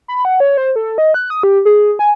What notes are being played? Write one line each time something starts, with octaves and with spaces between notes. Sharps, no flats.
B5
F#5
C#5
C5
A4
D#5
F#6
D#6
G4
G#4
G#5